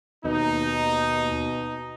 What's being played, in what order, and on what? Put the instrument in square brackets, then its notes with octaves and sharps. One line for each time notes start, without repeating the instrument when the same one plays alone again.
[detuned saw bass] D#2 [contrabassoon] B2 [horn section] D#4